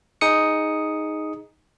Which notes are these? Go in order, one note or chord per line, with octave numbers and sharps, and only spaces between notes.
D#4 G#4 D#6 C#7